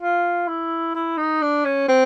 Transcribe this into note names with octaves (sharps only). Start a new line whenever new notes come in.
F4
E4
E4
D#4
D4
C#4
C4